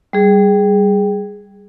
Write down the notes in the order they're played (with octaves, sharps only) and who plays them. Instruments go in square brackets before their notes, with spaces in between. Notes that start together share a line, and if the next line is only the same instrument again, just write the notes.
[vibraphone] G3 G#4